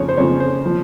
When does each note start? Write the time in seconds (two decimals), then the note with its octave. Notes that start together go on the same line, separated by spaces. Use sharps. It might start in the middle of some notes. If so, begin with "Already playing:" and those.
Already playing: F2 C#3 F3 C#5
0.09 C5
0.17 F2 C#3 F3 C#5
0.40 C5
0.66 F3